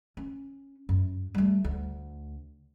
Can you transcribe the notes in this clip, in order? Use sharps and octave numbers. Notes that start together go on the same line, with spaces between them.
C#4
F#2
G3 A3
D2